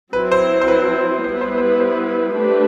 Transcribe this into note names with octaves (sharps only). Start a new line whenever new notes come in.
F#3 C4 E4 B4
C5
C5
B4
G3 B3 E4 B4 C5
C5
C5
C5
A3 D4 G4 B4